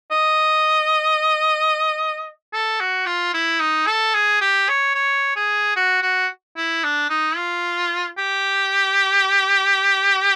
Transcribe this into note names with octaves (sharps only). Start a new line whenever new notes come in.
D#5
A4
F#4
F4
E4
D#4
A4
G#4
G4
C#5
C#5
G#4
F#4
F#4
E4
D4
D#4
F4
G4